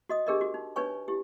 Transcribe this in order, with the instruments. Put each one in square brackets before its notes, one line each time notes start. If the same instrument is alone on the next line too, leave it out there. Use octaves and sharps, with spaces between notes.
[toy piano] F#4 D#5 D#6
D4 G4 G#4 A#4 D5 D#5
F#4
D#4
D4 D#4 B4 C#5 G#5 C#6
E4 G4